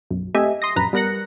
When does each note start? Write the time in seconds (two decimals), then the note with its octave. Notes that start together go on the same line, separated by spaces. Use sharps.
0.11 B1 F#2
0.35 A3 C4 G4 D#5 E5 G#5
0.62 C6 D#6 A#6
0.76 A#1 F#2 B4 A#5 B6
0.93 G3 B3 A#4 F#6 A#6 C#7